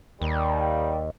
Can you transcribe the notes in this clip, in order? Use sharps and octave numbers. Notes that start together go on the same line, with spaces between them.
D#2 D#3 G3